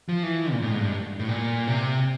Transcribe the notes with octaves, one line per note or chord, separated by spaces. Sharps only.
F3
E3
A#2
A2
G#2
G2
A2
A#2
C3